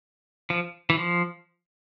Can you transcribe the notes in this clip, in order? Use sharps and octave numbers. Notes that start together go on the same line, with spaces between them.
F3
E3
F3